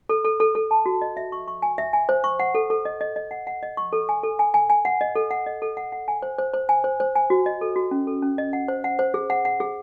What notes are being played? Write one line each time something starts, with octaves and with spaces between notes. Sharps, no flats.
A4
A4
A4
A4
A5
F#4
D#5
E5
C#6
C#6
G#5
E5
G#5
C5
C#6
F#5
A4
A4
D#5
D#5
D#5
F#5
F#5
D#5
C#6
A4
G#5
A4
G#5
G#5
G#5
F#5
D#5
A4
F#5
D#5
A4
F#5
F#5
G#5
C5
C5
C5
G#5
C5
C5
G#5
F#4
D#5
A4
F#4
C#4
A4
C#4
D#5
F#5
C5
F#5
C5
G#4
F#5
F#5
G#4